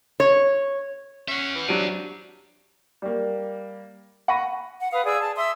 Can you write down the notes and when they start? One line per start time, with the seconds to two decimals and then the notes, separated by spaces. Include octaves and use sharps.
0.20 C#5
1.28 C#4 E5 F#5
1.55 E3
1.68 F3 F#3 D4 G4 D7 D#7
3.02 G3 A#3
4.28 F#5 B5 C#6 A#6 D#7
4.80 F#5
4.92 B4 F5 D#6
5.06 G#4 D5 E6
5.19 A5
5.37 E5 C6 D#6 E6